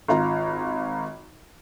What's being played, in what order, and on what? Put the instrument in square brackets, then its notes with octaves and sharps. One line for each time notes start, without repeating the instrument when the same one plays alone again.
[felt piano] G#1 F4 A#5